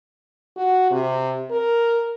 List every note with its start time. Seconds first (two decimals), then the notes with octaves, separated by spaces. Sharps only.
0.56 F#4
0.91 C3
1.51 A#4